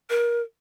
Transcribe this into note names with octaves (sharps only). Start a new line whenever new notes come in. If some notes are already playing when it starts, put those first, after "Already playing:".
A#4